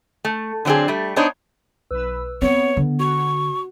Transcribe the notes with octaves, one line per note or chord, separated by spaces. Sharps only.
A3
D3 F#3 C4 D4 G#4
G3 A3
B3 D4 D#4 C5 C#5
B1 B4 E6
B3 C4 C#5
D3
F#4 C#6